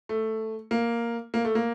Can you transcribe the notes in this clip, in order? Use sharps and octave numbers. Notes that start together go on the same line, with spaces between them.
A3
A#3
A#3
A3
A#3